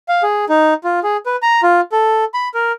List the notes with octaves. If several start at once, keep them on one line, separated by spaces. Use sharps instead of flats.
F5
G#4
D#4
F4
G#4
B4
A#5
F4
A4
B5
A#4